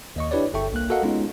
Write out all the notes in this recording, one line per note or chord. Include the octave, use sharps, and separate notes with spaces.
D#2 D#5 C#6
D4 E4 G4 B4 C#5 D5
G1 A4 E5 G5 C#6
C2 A#3 F#6
F#4 A4 A#4 D#5 F5 F#5
G#3 B3 C#4 D#4 F4